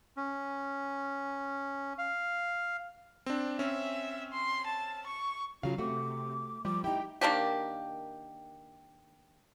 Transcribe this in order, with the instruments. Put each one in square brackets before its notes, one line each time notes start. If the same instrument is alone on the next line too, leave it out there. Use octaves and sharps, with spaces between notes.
[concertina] C#4
F5
[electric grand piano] C4 D4
[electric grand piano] C4 C#4 [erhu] E5
[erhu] C6
A5
C#6
[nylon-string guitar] C#3 F#3 [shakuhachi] F4 [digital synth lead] F5
[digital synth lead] C3 [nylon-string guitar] A3 F#4 [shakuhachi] D6
[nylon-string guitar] F3 [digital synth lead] G3 [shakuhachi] D6
[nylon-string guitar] D#4 E4 [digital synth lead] G4 [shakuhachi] G5
[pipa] D#3 A#3 D4 G4